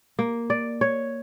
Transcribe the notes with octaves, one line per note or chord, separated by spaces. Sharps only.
A#3
D5
C#5